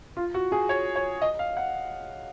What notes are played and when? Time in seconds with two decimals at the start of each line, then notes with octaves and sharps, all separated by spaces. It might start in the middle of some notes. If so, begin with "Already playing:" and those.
0.17 F4
0.34 F#4
0.52 G#4
0.69 C#5
0.96 C#5
1.22 D#5
1.39 F5
1.57 F#5